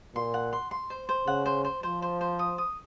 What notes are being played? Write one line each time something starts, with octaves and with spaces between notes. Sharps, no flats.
A#2 C6
F#5
C6
C6
C5
C5
C#3 F#5
C5
C5
F3 C5
C5
C5
D#6
D#6